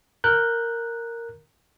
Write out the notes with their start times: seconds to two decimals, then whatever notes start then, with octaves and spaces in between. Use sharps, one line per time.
0.24 A#4 F#6 G6